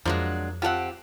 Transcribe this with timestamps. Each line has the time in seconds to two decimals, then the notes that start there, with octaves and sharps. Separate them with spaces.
0.05 F2 F3 F#3 G#3 A#3 D4
0.62 C4 F4 G4 A4 F#5